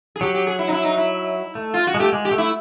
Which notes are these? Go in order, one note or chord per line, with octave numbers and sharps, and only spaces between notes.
G#4
F#3 G4
G4
G#4
E4
D#4
E4
D#4
E4
A3
F4
F#4
G#3
A3 G4
G#3
G4
A3
E4